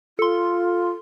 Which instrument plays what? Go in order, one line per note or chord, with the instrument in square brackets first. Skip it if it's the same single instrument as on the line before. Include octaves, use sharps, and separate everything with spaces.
[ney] F4 [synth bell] A4 C6